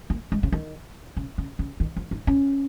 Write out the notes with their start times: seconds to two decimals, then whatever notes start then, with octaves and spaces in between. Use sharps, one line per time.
0.10 A#3
0.32 G#3
0.43 C#3
0.52 D#3
1.17 C#3
1.38 C#3
1.59 C#3
1.80 D#3
1.96 F3
2.11 D#4
2.27 C#4